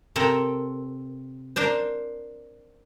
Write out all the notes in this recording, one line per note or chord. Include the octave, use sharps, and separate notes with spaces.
C3 C4 A4 A#4
D4 A#4 C5